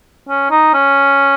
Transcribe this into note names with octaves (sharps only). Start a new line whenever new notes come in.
C#4
D#4
C#4